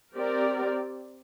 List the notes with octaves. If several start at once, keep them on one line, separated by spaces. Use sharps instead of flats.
C4 G4 A#4 D5